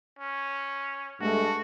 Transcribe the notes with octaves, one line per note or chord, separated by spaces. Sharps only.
C#4
G2 G#3 A3 F#4